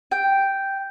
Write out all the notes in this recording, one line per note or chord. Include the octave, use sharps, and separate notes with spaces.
G5